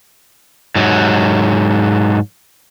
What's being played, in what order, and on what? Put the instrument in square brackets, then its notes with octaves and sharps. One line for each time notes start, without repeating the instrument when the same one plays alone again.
[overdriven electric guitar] G#2 F#3